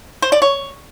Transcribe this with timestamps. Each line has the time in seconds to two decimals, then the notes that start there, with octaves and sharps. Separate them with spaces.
0.22 C5
0.32 D5
0.42 C#5